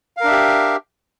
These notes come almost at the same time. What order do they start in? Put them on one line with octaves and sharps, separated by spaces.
F5 A#4 D4 E5 G4